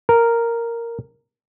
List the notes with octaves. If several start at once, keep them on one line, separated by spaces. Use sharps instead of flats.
A#4